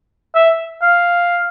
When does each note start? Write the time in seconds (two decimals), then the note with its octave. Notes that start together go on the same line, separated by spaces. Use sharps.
0.35 E5
0.82 F5